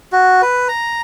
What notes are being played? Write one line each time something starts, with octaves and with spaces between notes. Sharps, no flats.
F#4
B4
A#5